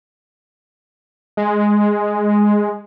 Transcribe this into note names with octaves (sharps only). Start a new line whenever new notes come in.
G#3